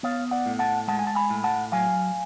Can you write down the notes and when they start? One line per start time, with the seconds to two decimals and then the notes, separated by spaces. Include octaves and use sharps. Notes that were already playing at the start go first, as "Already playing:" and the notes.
0.03 B3 C#5 F5
0.31 D5 F#5
0.46 A2
0.59 F#5 A5
0.88 G#3 F#5 A5
0.99 G#5
1.07 A5
1.15 G#5 B5
1.30 A2
1.44 F#5 A5
1.72 F#3 F5 G#5